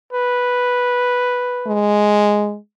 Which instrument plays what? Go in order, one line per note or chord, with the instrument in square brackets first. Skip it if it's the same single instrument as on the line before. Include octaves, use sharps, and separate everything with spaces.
[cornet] B4
[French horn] G#3